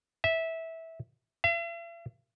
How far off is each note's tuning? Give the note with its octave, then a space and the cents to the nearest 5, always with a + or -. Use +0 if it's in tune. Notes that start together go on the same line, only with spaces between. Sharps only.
E5 -15
E5 +45